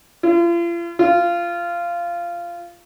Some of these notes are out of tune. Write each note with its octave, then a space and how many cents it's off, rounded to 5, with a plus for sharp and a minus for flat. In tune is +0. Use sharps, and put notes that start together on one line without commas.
F4 -40
F4 -15